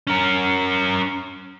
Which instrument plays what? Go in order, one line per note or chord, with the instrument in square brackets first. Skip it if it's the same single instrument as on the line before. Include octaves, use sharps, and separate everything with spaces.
[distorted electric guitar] C#4 A#4